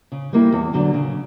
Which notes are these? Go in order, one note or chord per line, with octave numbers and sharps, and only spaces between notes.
C#3
G3 A#3 E4
E2
D3 F#3 C#4
C#3